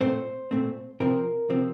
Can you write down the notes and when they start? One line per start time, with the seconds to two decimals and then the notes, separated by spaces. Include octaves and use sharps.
0.01 A#2 A3 C4 C5
0.51 A#2 A3 C4
1.00 C3 F3 C4 A#4
1.50 C3 F3 C4